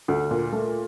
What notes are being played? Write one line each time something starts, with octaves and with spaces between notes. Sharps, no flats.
D2
A#2
A3